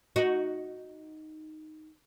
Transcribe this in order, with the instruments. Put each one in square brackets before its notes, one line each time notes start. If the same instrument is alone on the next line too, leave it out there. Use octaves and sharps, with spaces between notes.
[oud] D#4 F#4